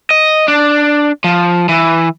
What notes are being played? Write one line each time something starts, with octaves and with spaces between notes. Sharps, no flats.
D#5
D4
F3
E3